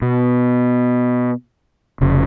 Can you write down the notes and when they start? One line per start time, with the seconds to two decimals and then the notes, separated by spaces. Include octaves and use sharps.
0.02 B2
2.01 F1 C#3